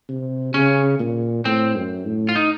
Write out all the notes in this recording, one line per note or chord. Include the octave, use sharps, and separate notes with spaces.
C3
C#3 C#4
A#2
A2 C4
F#2
A2
F4
D#4